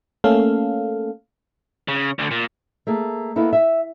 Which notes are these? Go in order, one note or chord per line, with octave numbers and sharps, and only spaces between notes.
A3 A#3 C#4 A4 F5
C#3
D2 D3
A#2
A3 A#3 G#4
A#3 B3 D#4 E4 A4
E5